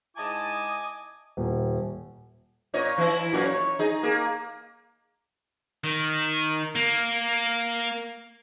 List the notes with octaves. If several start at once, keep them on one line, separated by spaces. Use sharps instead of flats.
G#2 E4 D#5 G#5 A5 D6
D#1
A#2 C#5 D#5
E3 E4
F#2 A#2 F#4
C#5
D#4 G#4 D#5
A#3 G#4
D#3
A#3